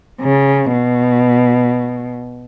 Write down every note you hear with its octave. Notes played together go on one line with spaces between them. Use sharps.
C#3
B2